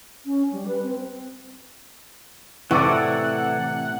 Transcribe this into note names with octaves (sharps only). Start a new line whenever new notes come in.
C#4
G3
B4
C4
A2 C3 E3 E4 A4 D5 F#5